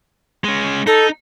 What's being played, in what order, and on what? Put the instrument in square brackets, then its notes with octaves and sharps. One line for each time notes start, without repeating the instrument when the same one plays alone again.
[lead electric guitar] G#3 C#4
[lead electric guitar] D#4 [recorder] A4